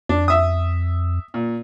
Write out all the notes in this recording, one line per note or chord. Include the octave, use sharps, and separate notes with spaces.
F2 D4
E5 D#6
A#2